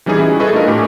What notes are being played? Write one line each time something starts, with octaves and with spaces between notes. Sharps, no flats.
E3 G3 C#4 D#4 G#4
E4 F#4 G#4
G#4 A4 B4 D#5 B5 C#6
A3 D4 F4 A#4
A2 G4 G#5